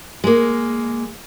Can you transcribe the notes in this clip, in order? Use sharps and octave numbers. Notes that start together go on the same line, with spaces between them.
G#3 A#3